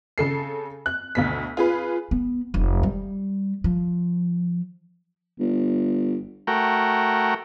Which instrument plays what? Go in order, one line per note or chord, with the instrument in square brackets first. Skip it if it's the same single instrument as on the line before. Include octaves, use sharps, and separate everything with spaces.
[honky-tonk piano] C#3 A4 C7
F#6
D2 B2 B6
F4 G#4 B4
[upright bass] B3
F1
G3
F3
[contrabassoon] G1
[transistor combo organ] A3 F#4 A#4 G5